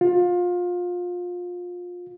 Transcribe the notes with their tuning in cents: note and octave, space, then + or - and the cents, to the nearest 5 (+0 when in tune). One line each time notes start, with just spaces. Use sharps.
F4 +25